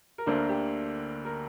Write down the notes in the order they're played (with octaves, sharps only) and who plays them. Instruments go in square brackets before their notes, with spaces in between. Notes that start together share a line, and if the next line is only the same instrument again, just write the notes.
[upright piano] A#4
D2 D3 A#3 D4 C5
A#4
G4
A#4